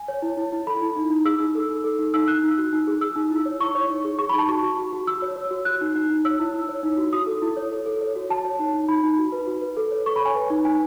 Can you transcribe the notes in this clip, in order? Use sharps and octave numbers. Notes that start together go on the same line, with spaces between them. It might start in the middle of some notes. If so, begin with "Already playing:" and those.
Already playing: G#5
C#5
E4
E4
E4
A4 B5
E4
D#4
D#4
G#4 E6
D#4
A4
D#4
A4
D#4
D#4 E6
D#4 F#6
D#4
F#4
D#4
G#4
G#4 E6
D#4
E4
C#5
E4 C#6
C#5
D#4
G#4
G#4 C#6
B5
D#4
A5
F#4 C#6
F#4
F#4
F#4
F#4 E6
C#5
C#5
F#4
F#4 F#6
D#4
D#4
D#4
C#5 E6
E4
E4
C#5
D#4
F#4
F#4 D#6
A4
E4
C#5
A4
A4
C#5
F#4
F#4 A5
C#5
D#4
D#4
D#4 B5
D#4
F#4
B4
F#4
B4
A4
C#5
A4 C#6
B5
C#5 G#5
B4
D#4
D#4 G#5